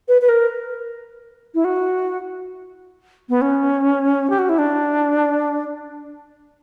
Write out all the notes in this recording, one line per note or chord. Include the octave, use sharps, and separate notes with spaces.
B4
B4
A#4
E4
F#4
B3
C#4
G4
F#4
E4
D4